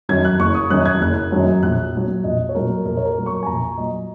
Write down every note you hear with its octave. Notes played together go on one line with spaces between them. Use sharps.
F#2 D#3 F#3 G#6
F#6
F#1 C#6
D#6
F#2 D#3 F#3 F#6
G#6
F#1 F#6
F#2 D#3 F#3
A#1 F#6
A#2 F#3
A#1 D#5
C#5
A#2 F#3 A#4
A#1 A#4
C#5
A#4
A#2 F#3
C#6
G#5
A#1 A#5
A#2 F#3 D#5